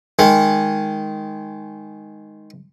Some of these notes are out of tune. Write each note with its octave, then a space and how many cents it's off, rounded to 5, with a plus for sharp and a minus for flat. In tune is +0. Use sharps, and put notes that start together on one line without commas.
D#3 +0 G#3 +0